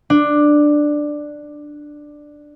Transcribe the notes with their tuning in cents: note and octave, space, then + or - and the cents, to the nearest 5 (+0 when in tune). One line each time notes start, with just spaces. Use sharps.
D4 +10